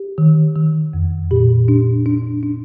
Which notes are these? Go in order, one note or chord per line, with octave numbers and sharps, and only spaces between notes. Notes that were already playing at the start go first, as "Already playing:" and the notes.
Already playing: G4
D#3
D#3
F2
A#2 G4
D4
D4
D4